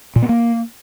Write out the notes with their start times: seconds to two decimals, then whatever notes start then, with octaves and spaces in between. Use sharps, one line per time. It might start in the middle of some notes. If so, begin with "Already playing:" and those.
0.16 A#2
0.22 B3
0.29 A#3